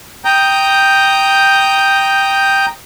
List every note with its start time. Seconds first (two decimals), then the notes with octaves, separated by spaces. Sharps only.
0.25 G5 A#5 D#6 G6